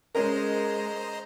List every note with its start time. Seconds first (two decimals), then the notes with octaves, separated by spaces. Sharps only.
0.15 G#3 C#4 A#4 C5 D#5 A#5